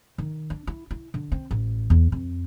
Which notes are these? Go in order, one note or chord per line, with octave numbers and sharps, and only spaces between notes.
D#3
D4
E4
E4
D3
C4
A1
E2
F2